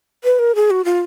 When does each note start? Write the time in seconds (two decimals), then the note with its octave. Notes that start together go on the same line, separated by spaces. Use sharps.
0.24 B4
0.39 A#4
0.55 G#4
0.71 F#4
0.85 F4